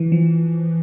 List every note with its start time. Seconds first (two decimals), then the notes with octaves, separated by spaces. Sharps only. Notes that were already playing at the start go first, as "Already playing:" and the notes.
Already playing: E3
0.12 F3